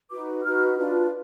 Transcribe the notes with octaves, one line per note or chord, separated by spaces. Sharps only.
D#4 F#4 B4 D6
D#4 F#4 B4 F6
D4 F4 B4